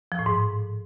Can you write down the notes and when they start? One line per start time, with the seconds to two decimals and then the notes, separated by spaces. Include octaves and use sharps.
0.12 F3
0.19 A2
0.26 G#2